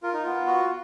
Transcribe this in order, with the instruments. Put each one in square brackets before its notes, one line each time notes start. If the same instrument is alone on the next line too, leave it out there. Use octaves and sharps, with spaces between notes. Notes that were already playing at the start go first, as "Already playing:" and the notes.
[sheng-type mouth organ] F4 [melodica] A#4
[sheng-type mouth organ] D#4
[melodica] B3 [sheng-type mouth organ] F4
[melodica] F#4